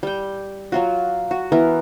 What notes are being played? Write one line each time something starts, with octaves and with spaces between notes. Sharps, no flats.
G3 G5
F#3 F4 F#4
F#4
E3 B3 A#4